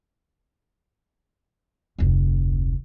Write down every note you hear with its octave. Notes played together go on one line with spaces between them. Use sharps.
F1 D2